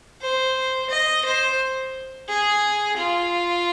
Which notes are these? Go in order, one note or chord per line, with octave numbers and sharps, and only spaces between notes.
C5
D#5
C5
G#4
F4